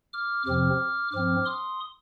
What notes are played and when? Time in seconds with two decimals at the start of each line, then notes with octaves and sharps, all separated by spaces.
0.13 D6 F6
0.46 F2 C3 F3 C4 D6 F6
1.12 G2 F3 C4 D6 F6
1.46 C6 D#6